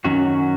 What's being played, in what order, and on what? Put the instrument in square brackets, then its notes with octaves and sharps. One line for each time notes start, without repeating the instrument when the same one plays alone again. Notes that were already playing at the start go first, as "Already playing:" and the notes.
[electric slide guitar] F#2 D#3 F#3 C#4 F#4